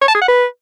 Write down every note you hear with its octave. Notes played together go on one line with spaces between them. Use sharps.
C#5
A5
G#4
F#5
B4